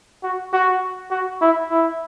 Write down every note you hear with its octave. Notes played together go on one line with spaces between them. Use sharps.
F#4
F#4
F#4
E4
E4